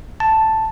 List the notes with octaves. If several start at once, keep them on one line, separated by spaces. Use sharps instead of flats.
A5